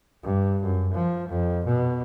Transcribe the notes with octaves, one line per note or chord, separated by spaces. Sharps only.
G2
F#2
F3
F2
B2